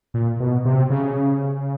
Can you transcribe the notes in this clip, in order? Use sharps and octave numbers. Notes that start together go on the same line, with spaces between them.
A#2
B2
C3
C#3